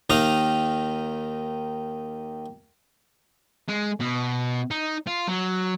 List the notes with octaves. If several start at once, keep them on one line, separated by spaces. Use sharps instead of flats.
D#2 D#3 D#4 D#5 F5 A#5
G#3
B2
D#4
F4
F#3